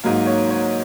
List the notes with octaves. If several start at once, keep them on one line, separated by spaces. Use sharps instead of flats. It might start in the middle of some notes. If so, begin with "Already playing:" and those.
G#2 F#3 A#3
C#5
C#5